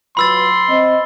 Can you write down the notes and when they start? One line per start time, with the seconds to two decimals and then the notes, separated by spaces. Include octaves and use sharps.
0.17 F#3 F4 B4 B5 C6 E6 A6
0.68 C4 D#5